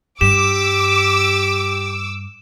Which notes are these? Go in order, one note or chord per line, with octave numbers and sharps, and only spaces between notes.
G2 G4 D6 E6 E7